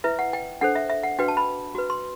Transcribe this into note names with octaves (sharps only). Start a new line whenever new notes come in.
E4 B4 E5
F#5
G5
D4 A4 C5 F#5
E5
E5
F#5
D4 F#4 B4 G5
A5
B5
F#4 B4
C6